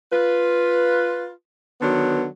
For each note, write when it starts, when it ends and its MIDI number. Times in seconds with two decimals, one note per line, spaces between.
0.11 1.29 65
0.11 1.29 71
1.80 2.24 50
1.80 2.24 51
1.80 2.24 54
1.80 2.24 59